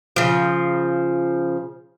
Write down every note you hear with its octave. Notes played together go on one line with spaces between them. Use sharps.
C#3 F3